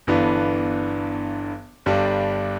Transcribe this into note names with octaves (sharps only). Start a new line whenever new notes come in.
G1 G2 E3 B3 D4
G1 G2 G3 D4